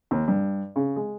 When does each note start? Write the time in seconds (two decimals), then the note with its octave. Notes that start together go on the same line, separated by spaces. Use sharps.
0.11 D#2
0.28 G2
0.76 C#3
0.96 G#3